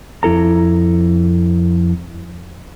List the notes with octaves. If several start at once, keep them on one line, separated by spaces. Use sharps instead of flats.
F2 E4 A4 A#5